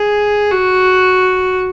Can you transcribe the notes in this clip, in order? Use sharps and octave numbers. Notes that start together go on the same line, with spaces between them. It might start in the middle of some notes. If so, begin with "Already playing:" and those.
Already playing: G#4
F#4